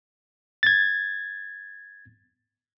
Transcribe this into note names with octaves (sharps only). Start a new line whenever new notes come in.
G#6 A6